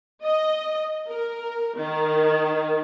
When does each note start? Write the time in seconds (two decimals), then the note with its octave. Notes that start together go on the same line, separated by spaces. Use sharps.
0.22 D#5
1.07 A#4
1.76 D#3